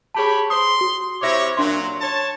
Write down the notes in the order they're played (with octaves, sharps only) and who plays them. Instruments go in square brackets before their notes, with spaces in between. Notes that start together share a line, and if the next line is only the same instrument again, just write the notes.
[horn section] G4 C#5 B5 [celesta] G#4 A5
[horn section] C6 [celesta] D#6
[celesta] F#4
[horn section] C3 E4 C#5 [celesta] D6 A#6
[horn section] A#2 F#3 [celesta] D4 C6
[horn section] C#5 A5